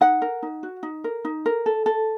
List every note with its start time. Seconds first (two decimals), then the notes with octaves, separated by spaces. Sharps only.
0.01 D#4 F#5
0.22 A#4
0.43 D#4
0.63 F#4
0.83 D#4
1.04 A#4
1.25 D#4
1.46 A#4
1.66 A4
1.86 A4